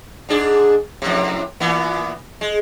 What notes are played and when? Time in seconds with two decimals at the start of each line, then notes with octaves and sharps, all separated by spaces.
0.29 G#2 D4 G#4
1.02 F2 A2 C3
1.60 A#2 E3 B3
2.41 G#3